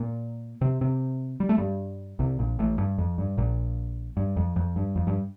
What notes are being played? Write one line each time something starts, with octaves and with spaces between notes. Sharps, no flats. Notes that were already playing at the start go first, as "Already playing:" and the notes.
Already playing: A#2 A#3
C3 C4
C3 C4
G3
A3
G2 G3
C2 C3
A#1 A#2
A1 A2
G2
F2
G2
A#1 A#2
G2
F2
F2
G2
F2
G2